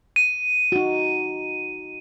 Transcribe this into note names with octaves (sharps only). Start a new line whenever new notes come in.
D#7
D#4 F#4